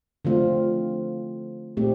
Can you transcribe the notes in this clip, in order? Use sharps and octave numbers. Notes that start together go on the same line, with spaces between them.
D3 F3 A3 C4 F4
A#2 A3 C4 D#4 G4